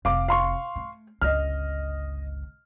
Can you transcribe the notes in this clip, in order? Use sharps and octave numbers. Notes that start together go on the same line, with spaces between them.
F1 F5 D6
F5 C6 C#6
A3
G1 C#2 D#5 F6